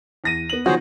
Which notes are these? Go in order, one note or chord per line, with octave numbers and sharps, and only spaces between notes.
E2 A#6 D#7
B3 F#7
D#3 F3 F#4 G#4 C5 C#5